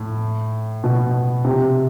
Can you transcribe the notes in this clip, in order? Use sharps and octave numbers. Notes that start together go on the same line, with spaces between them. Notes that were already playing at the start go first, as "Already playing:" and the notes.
Already playing: A2
B2
C3